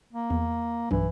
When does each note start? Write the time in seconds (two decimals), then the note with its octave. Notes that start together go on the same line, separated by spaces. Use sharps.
0.13 A#3
0.30 E2
0.91 B1 G2 E3